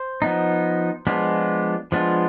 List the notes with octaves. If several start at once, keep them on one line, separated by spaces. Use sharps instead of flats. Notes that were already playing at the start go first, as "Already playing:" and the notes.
Already playing: C5
F3 B3 D#4
F3 G#3 B3 D4 F4
F3 G#3 B3 D4 F4